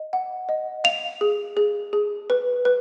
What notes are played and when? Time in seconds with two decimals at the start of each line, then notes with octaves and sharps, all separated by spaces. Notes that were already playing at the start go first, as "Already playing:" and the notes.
Already playing: D#5
0.13 F#5
0.49 D#5
0.84 F5 F7
1.21 G#4
1.57 G#4
1.93 G#4
2.30 B4
2.65 B4